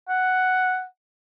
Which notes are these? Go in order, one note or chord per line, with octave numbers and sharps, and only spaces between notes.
F#5